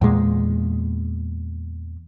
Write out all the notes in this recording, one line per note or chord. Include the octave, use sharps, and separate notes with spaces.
E2 A#2 G#3